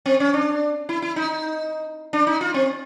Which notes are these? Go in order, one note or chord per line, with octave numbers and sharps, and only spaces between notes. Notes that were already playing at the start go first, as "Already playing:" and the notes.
C4
C#4
D4
E4
E4
D#4
D4
D#4
F4
C4